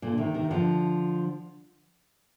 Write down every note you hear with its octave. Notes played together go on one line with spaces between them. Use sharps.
A#2 D3
C3 D#3
C3 D#3
D3 F3